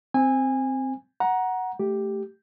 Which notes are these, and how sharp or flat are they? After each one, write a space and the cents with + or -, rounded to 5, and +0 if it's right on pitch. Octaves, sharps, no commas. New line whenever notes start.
C4 +0 G#5 -20
F#5 +0 A#5 +20
A3 +0 G4 +0